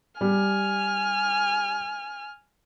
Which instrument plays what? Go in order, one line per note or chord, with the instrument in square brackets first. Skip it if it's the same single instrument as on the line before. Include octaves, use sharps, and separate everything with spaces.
[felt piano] G3 [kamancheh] G#5 F6